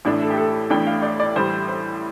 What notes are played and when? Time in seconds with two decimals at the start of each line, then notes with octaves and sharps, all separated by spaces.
0.05 A1 A2 A3 D4
0.22 A4
0.30 G4
0.38 A4
0.70 A1 A2 A3 D4 G5
0.87 F5
1.02 D5
1.20 D5
1.36 A1 A2 G3 C5
1.68 C5